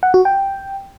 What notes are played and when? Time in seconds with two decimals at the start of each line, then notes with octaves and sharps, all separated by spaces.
0.03 F#5
0.14 F#4
0.25 G5